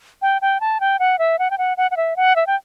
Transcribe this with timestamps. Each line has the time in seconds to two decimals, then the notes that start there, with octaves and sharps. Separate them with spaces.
0.22 G5
0.42 G5
0.61 A5
0.80 G5
0.99 F#5
1.19 E5
1.39 F#5
1.51 G5
1.58 F#5
1.77 F#5
1.91 F#5
1.97 E5
2.16 F#5
2.36 E5
2.47 G5